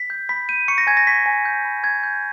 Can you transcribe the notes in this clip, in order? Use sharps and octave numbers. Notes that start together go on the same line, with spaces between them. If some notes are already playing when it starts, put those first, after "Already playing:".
Already playing: B6
G6
B5 B6
G6 D#7
C#6 C#7
A#6
G#5 G#6
A#6
C#6 B6
G#5
G6
B5
G6 G#6
G6